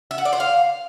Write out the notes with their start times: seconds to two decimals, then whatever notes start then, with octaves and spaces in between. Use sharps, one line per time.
0.11 E5
0.18 F#5
0.25 D5
0.33 C5
0.40 F5